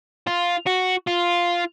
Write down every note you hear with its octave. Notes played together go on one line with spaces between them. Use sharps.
F4
F#4
F4